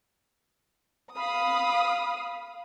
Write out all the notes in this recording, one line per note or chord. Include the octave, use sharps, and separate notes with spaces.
F5 B5 D#6